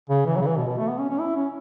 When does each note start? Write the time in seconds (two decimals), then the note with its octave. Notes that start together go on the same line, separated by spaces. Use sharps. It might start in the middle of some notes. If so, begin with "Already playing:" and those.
0.10 C#3
0.26 E3
0.36 F#3
0.41 C#3
0.46 E3
0.57 B2
0.68 B2
0.78 A3
0.88 B3
0.99 C#4
1.10 C#4
1.20 E4
1.36 C#4